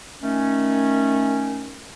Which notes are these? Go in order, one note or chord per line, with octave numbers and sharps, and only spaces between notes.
D#3 A3 C#4